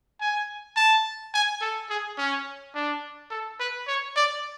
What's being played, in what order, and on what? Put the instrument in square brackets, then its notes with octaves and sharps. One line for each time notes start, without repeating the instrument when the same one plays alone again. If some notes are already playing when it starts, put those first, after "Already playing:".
[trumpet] G#5
A5
G#5
A4
G#4
C#4
D4
A4
B4
C#5
D5